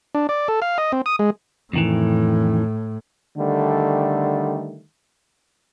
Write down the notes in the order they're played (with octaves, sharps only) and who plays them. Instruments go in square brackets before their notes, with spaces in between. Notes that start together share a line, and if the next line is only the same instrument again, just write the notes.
[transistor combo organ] D4
D5
A4
F5
D#5
C4
D#6
G#3
[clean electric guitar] F2 D#3 E3 [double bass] A2
[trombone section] D3 D#3 G3 A3